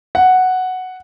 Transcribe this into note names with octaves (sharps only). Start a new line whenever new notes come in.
F#5